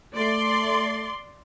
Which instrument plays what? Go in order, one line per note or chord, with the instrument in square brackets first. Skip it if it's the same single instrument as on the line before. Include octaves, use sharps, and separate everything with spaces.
[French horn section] A3 [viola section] D5 C6